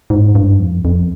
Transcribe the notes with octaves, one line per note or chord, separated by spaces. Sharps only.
G#2
G2
F2
F2